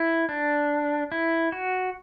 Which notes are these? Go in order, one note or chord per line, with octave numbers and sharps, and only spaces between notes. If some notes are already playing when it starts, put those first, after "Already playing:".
Already playing: E4
D4
E4
F#4